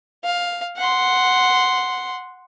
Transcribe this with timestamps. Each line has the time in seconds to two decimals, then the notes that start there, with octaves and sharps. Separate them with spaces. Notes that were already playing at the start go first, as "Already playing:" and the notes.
0.25 F5
0.77 F#5 C6